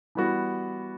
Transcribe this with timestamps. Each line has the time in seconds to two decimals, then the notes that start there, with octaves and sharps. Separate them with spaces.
0.15 E3 G3 B3 F#4